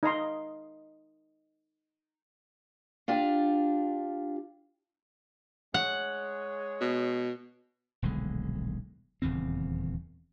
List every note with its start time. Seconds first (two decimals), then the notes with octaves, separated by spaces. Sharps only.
0.03 D#4 D#5 A#5 C6
3.08 D4 F4 G4
5.74 G#3 C#5 F#5
6.81 B2
8.02 D#1 B1 D3 G#3
9.22 D#1 E2 C#3 C4